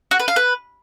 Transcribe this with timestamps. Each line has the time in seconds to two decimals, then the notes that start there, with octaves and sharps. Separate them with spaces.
0.11 F#4
0.20 B4
0.28 F5
0.36 B4